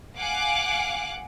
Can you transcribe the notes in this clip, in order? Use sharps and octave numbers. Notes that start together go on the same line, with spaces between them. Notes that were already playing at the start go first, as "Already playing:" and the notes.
F5 F#5 G#5 D6 F#6